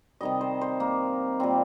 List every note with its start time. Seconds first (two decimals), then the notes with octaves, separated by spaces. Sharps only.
0.21 C3 D#3 G3 D#5
0.41 C5
0.61 C5
0.80 A#3
1.40 A#2 G3 C4